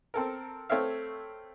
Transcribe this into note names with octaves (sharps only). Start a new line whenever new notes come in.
C4 A4 A#4
A3 C4 C#5 E5 F5